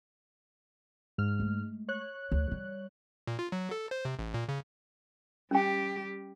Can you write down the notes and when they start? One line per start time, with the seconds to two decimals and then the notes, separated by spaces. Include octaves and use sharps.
1.18 G#2 F6
1.40 G#3 A3
1.88 C#5 F#6
2.32 D2
2.51 G3
3.27 A#2
3.39 F4
3.52 F#3
3.71 A4
3.91 C5
4.05 C3
4.19 A1
4.34 A#2
4.49 C#3
5.51 G3 C#4 G4 G5